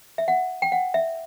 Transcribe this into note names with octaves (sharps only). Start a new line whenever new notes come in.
E5
F#5
G5
F#5
E5